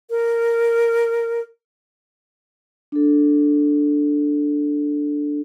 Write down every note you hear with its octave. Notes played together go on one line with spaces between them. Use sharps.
A#4
D4 A4